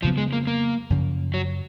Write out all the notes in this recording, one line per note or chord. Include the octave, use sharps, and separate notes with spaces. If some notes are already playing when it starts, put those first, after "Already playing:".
F2 C#3 F3 F#3 B3
G#3
A#3
A#3
F#2 C#3 F3
F#3